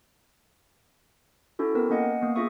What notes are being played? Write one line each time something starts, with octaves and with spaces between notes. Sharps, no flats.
C#4 E4 F#4 A4
B3 C4 A#4
A#3 C#4 D#5 F#5 G#5 A#6
A#3 B3
C#4 F4 G#4 E5 C#6 D#6